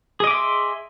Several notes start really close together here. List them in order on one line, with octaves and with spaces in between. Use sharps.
G#4 D#5 D6 E5 C6